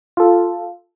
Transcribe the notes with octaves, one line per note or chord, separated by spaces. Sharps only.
F4 A4